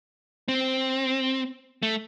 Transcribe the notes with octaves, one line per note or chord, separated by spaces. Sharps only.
C4
A3